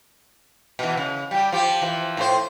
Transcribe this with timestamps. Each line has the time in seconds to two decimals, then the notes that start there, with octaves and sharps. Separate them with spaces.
0.79 B2 E3
0.97 C#3
1.31 G3 G4
1.52 F3 G4
1.82 E3 F3
2.17 A2 F3 C5